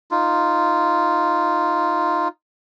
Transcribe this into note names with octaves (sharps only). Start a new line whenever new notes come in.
D#4 F4